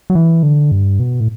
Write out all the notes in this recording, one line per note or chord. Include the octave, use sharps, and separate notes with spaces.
F#3
E3
D3
G2
B2
A2